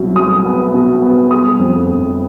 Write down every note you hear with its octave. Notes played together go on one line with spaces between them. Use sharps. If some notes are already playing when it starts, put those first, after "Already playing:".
Already playing: C2 B2 F#3
F#3 D#6
B3
B2
B3
G3 D#6
F2
G1